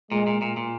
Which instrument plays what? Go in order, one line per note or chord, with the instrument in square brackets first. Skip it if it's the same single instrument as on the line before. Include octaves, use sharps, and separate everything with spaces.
[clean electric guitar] A#2 [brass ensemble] G#3
[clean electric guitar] A#2
A#2
A#2